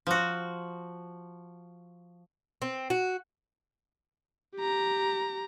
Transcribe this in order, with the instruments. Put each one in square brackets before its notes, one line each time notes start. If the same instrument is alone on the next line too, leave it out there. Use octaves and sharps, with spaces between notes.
[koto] F3 F#4
[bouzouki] C4
F#4
[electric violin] G4 A#5